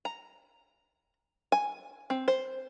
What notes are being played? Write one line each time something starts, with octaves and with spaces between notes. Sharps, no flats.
A#5
G#5
C4
C5